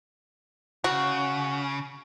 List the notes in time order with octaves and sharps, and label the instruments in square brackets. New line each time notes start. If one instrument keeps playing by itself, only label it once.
[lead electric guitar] C#3 [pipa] F#4